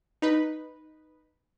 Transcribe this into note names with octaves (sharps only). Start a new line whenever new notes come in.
D#4 B4